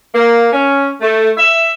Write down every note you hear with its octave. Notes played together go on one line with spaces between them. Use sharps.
A#3
C#4
A3
E5